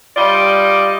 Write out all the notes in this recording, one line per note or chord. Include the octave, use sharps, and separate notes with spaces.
G3 F4 D5 D#5